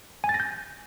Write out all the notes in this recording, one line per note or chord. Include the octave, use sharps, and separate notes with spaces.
G#5
A6
A#6
G6